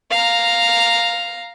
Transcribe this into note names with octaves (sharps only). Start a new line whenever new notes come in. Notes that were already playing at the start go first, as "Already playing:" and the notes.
F5 A#5